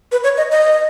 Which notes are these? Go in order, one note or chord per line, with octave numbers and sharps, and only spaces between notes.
B4
C#5
D#5
D#5